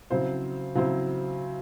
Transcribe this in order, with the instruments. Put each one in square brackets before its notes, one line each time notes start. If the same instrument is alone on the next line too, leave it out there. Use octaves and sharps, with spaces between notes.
[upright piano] C#3 F#3 C4 E4 C5
C#3 F#3 C4 E4 C5